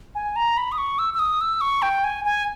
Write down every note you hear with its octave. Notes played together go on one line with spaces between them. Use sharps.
G#5
A#5
B5
D#6
C#6
E6
E6
D#6
E6
C#6
G5
G#5
G#5